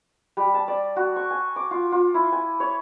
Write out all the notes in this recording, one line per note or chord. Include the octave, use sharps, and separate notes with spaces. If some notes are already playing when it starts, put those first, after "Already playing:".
G3
A5
D5
F#4
C#6
G#5
D6
F4
F4
E4
G#5
C#5